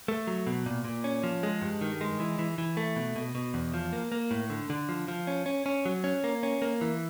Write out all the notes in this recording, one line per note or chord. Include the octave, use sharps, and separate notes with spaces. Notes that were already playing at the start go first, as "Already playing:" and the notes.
A3
F#3
B2
A#2
A#2
C#4
F3
G#3
G2
D#3
G#3
E3
E3
E3
A3
B2
B2
B2
E2
F3
A#3
A#3
A2
D3
D3
F3
F3
C#4
C#4
C#4
F#3
C#4
A#3
C#4
A#3
E3